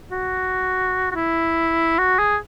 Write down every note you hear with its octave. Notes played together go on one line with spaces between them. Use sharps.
F#4
F#4
E4
F#4
G#4